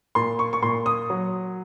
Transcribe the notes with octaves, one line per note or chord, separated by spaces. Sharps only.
A#2 C6
C#6
C#6
A#2 C6
D#6
F#3